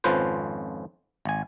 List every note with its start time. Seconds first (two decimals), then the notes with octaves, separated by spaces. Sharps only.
0.04 G#1 F2 F3 C#4 B4 C5
1.25 G#1 G#5